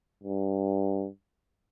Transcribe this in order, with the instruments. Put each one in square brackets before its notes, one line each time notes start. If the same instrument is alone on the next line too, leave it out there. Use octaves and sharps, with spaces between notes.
[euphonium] G2